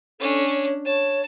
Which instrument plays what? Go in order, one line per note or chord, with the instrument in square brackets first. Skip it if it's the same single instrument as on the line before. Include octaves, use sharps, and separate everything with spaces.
[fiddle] C#4 D4 [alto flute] A4
[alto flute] C#5
[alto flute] C#5 [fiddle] A5